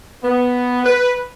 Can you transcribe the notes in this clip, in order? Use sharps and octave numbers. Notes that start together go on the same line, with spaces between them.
B3
B4